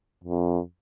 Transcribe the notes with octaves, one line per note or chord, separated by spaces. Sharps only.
F2